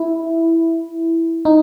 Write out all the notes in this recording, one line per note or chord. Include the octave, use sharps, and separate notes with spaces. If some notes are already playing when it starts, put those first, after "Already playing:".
Already playing: E4
D#4